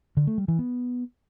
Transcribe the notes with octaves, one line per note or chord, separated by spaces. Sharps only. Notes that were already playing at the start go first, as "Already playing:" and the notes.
D3
A3
G3
E3
B3